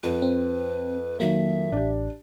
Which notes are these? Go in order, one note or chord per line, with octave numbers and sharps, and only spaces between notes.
F2 B4
C4
D#3 F#3 A#3 E5
A1 D4 G4